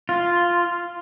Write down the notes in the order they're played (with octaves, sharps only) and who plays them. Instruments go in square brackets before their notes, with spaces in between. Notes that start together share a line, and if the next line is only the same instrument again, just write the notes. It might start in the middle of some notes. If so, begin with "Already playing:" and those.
[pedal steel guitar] F4